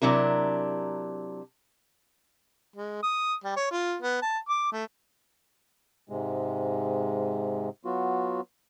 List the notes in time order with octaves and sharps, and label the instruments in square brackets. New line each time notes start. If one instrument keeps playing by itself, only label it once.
[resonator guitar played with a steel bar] C3 F#3 D4 E4 A#4
[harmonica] G#3
D#6
G3
C#5
F4
B3
A5
D6
A3
[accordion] G#2 C3 G#3
F#3 B3 F4 F#4